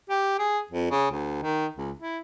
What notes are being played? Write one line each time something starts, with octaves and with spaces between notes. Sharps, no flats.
G4
G#4
F2
C#3
D2
D#3
C#2
E4